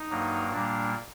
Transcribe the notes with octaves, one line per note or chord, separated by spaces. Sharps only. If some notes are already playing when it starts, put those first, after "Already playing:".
Already playing: D#4
G2 F#3 A#3
A#2 G3 A#3 D4